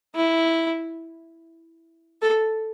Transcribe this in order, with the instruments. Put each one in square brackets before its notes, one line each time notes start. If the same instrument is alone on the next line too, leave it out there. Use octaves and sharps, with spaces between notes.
[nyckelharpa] E4
A4